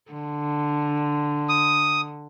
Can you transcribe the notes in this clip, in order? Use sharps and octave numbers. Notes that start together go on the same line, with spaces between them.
D3
D#6